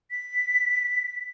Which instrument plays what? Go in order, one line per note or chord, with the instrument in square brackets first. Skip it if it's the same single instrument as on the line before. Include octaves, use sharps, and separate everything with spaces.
[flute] B6